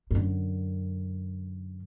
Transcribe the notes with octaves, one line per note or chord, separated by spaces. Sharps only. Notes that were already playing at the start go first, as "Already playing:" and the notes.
F#2 D3